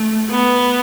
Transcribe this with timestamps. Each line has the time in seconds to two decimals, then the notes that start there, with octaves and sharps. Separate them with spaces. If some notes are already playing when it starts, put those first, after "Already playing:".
Already playing: A3
0.30 B3